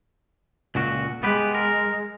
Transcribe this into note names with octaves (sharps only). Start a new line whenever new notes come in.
C#2 A#2 F#4
G#3 B3 G4 B4
A#4